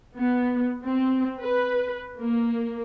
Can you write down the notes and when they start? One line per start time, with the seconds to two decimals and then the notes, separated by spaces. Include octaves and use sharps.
0.17 B3
0.84 C4
1.39 B4
2.19 A#3